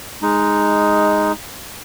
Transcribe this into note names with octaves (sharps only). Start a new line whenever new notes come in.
G#3 D#4